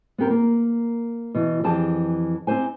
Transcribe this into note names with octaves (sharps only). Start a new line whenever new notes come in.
B3 C4 G4 A#4
A#3 A#4
B2 E3
F2 E3 G4 G#4 A5
C4 D#4 G4 C5 G#5